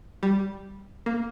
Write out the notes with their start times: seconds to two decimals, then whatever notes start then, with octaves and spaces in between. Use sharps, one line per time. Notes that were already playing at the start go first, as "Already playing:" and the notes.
0.23 G3
1.06 A#3